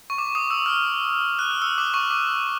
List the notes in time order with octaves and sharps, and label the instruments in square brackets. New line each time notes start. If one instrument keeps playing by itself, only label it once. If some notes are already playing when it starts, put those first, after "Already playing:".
[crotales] C#6
D6
D#6
E6
F6
F#6
F6
E6
D6
C#6
D6